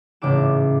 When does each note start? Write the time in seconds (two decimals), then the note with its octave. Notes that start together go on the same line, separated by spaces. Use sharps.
0.22 A1 G#2 C#3 D6 E7